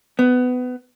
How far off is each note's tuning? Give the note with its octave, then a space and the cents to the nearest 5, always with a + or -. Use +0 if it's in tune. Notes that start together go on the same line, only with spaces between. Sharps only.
B3 +20